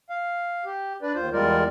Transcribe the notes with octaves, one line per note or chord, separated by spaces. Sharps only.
F5
G4
D4 B4 D5
D#2 F4 C5
E2 G3 G#3 F4 A#4 D5